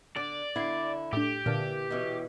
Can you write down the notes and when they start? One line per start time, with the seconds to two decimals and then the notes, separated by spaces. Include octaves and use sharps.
0.17 D3 D5
0.56 D3 E4 G#6 C7
1.13 A2 D4 G4
1.46 A#2 D3 E3
1.90 B2 E3 C#4